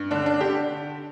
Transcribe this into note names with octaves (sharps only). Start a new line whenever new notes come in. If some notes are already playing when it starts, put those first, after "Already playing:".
Already playing: G2
D3 D4
D4
D3 G4